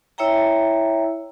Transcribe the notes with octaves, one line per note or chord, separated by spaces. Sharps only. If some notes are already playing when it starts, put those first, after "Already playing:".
E4 C#5 E5 G5 A#5